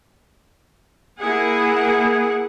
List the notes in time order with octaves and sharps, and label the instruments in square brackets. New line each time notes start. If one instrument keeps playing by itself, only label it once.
[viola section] A#3 E4 G#4 F#5